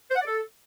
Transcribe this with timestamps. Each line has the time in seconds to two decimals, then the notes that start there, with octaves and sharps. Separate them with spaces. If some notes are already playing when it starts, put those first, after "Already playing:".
0.11 C5
0.16 F#5
0.21 D5
0.27 A4